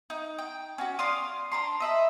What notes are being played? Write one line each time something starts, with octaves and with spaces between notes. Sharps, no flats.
D#4
G5
C#4 F#4 G4
D5 F5 C6 D#6
D4 A#5 C6
D#5 E5 B5